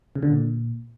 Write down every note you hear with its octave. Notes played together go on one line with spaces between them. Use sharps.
C#3
D3
A#2